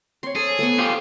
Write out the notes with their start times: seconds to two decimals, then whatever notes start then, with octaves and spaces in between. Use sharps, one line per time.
0.23 C4 C#5 C6
0.36 G#4 A4
0.59 A3 B3 F#5
0.79 F4 G4